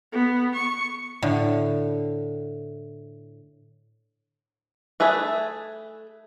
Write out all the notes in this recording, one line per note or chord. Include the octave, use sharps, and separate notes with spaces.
B3
C#6
A2 D3
A3 G#4 B4 E5